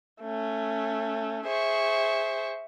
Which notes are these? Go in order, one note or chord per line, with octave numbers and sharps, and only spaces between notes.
A3 C#4
G#4 C5 E5 C#6